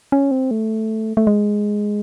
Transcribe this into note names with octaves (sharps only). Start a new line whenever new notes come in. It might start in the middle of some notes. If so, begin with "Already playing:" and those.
C#4
C4
A3
A3
G#3